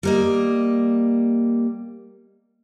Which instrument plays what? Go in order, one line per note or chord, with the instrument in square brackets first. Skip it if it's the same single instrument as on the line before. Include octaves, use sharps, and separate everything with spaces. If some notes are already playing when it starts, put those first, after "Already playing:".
[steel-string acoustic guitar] G3 A#3 D#5